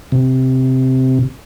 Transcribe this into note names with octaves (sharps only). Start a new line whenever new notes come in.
C3